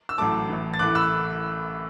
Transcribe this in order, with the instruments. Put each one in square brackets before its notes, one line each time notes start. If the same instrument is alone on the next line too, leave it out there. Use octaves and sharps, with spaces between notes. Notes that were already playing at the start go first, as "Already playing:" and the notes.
[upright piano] E6
A1 A2 F#3 A3 A5 D6
A1 A2 E3
A6
A1 A2 E3 A3 D6 F#6
B5 E6